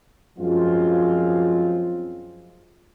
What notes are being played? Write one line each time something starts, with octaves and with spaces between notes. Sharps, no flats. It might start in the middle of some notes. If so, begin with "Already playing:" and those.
F#2 F3 G#3 C4 F4